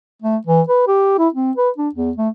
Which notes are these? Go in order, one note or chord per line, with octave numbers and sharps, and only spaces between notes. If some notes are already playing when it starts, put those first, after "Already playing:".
A3
E3
B4
G4
E4
C4
B4
D4
E2
A3